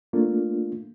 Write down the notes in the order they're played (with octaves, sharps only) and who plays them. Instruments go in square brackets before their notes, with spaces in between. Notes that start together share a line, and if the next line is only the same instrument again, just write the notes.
[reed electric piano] A3 A#3 D4 F4